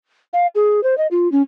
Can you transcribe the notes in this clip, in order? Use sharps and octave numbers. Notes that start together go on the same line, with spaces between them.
F5
G#4
C5
D#5
F4
C#4